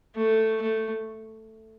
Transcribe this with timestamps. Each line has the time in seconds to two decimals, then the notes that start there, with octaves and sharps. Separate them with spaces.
0.16 A3
0.62 A3